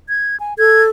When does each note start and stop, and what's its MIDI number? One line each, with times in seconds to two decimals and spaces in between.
0.09 0.39 92
0.40 0.54 80
0.58 0.89 69
0.58 0.82 92